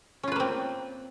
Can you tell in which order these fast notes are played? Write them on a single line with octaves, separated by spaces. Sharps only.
C#4 F4 B4 A#3 C4